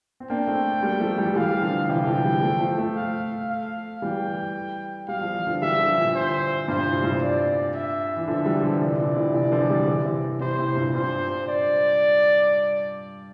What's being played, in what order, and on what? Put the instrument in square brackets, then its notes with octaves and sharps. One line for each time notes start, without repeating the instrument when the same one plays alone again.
[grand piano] C4
[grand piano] A#3 D4 [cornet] G5
[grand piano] A3 C4
G3 A#3
F3 A3
E3 G3
[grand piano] E3 G3 [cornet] F5
[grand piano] D3 F3
[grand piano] C3 E3 [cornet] G5
[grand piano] D3 F3
E3 G3
F3 A3
F3 A3
F3 A3
[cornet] F5
F5
[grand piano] E3 G3 [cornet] G5
[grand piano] G3 [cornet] F5
[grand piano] F3
E3
D3 F3
[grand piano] E3 G3 [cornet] E5
[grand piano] D3 F3
A#2 D3
[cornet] C5
[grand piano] G2 A#2 [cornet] C5
[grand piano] A2 C3
G2 A#2
[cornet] D5
E5
[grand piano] E3
[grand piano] D3 F3 [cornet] E5
[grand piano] E3 G3
D3 F3
[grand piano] C3 E3 [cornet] D5
[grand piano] A#2 D3
A2 C3
C3 E3
D3 F3
E3 G3
C3 E3
C3 E3
[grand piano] A2 C3 [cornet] C5
[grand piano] A2 C3
G2 A#2
[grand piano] G2 A#2 [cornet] C5
[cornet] D5